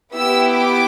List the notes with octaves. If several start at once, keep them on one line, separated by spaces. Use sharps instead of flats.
B3 E4 G4 E6
D6